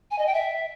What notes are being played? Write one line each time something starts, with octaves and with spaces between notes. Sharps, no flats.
G#5
D#5
G5
E5